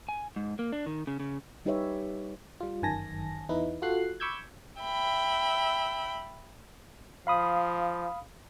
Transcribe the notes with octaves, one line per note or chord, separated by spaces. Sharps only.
G#5
G#2
A#3
D4
D#3
C#3
C#3
G3 D#4 G4 B4 C#5 E5
G3 F4
G1 F#2 D#3 G#5 A5 A#6
E2 D#4 E4 B4
F4 F#4 A4 F#6 C7
B5 C#6 D6 E6 G6 G#6
E5 G5 B5
F3 F5 B5 D#6